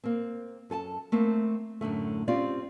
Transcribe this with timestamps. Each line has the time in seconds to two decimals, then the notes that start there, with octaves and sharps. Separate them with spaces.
0.04 A#3 C4
0.70 F#2 A4 G#5 A5
1.12 A3 A#3 C4
1.81 F#2 A2 D3 A3
2.28 C4 C#4 F4 G4 D5